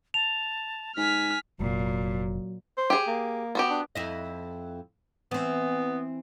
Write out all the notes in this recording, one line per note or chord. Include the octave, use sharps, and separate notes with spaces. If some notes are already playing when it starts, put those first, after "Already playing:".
A5 F7
G#2 G#5 F6 B6
F1 A#2 F#3
C5
G4 G#4
A#3
B3 F#4 G4
D4
F2 E4 D#5
E3 B3 C4